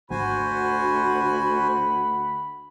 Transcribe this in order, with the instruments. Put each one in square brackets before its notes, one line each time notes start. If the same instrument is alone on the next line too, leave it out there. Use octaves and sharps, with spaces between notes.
[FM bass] G#1 [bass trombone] D2 [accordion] F#4 C5 G#5 [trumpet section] F#5 B5